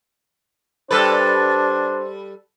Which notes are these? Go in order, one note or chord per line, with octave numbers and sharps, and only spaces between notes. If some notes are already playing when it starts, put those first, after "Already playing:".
G3 D4 A4 B4 C5